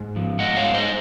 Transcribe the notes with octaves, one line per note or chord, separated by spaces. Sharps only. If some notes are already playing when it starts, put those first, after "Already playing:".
Already playing: G#2
F3
G#2 D#5 F#5
C#5 F5
G#3
C5 D#5